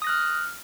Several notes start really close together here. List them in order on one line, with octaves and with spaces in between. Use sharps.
D#6 A#6 F#6 F6